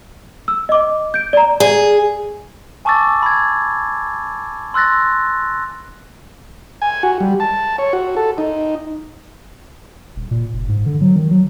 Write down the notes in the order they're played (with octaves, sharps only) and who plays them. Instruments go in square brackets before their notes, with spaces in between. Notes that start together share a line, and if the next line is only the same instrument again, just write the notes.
[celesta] E6
D#5 D6
G6 D7
D5 A#5
[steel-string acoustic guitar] G#4 [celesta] D5
[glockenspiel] G#5 A5 C#6 D6 E6 A6
B5 G#6
C6 E6 F#6 A6 A#6
[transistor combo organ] G#5
F#4
G3
A5
C#5
F#4
A4
D#4
[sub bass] D#1
A#2
F1
G#2
D3
F#3
D#3
F#3